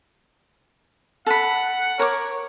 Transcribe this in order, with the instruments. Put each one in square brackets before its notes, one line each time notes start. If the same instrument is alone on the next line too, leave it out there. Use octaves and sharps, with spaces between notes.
[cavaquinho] A4 B5 [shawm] F#5
[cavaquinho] A#4 D6 [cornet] C#5